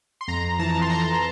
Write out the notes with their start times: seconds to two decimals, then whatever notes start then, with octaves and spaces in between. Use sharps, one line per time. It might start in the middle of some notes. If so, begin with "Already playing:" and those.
0.21 C6
0.28 F2 A#5
0.59 E3 A5
0.82 C6
0.90 E3 A#5